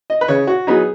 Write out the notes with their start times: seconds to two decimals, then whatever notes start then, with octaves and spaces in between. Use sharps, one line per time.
0.10 D#5
0.21 B4
0.28 C#3 C#5
0.47 F#4
0.67 F#3 B3 D#4 G#4